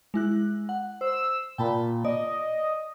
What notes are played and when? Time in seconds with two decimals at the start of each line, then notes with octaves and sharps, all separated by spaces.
0.14 G#3 E4 F#6
0.69 F#5
1.01 C5 E6
1.58 A#2 G5 A5 B5
2.05 D5 D#5